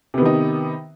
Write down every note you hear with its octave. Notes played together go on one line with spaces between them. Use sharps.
C3 D#3 B3 D#4